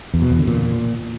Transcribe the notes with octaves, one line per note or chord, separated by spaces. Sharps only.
E2
B2
E2
D3
A#2